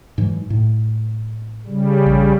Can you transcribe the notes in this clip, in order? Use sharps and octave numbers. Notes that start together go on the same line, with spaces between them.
G#2 E3 F#3
A2
C#3 G3
A#1